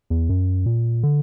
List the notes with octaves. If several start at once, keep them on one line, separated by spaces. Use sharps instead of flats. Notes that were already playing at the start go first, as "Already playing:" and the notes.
E2
F#2
A#2
D3